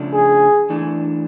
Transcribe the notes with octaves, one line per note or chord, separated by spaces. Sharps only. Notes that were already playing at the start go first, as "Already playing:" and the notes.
Already playing: C#3 F3 A3 D4
G#4
E3 A3 D4